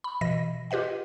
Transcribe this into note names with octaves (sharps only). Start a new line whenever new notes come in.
B5
B2 E3 D#5 A#6
F4 G4 B4 D#5 F#5